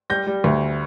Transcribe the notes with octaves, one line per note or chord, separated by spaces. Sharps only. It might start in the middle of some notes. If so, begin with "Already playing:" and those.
G3 G6 A#6
G3
D2